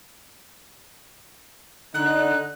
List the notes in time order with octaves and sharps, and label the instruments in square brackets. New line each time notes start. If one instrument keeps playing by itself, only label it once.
[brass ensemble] D3 D#4 [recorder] F#6